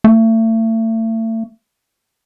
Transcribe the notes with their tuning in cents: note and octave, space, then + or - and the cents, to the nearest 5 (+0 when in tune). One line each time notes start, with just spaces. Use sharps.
A3 +35